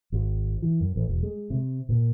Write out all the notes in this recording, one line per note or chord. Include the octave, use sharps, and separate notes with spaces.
G#1
E3
F#2
A1
E1
G#3
C3
A#2